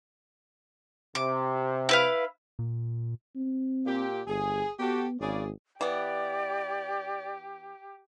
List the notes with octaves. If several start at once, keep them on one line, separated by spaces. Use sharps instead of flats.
C3 D6
E4 B4 F5
A#2
C4
A#2 G4
G1 G#4
B3 F#4 G4 A4
G#1 C#3 G#4 D5
E3 B3 G4 D5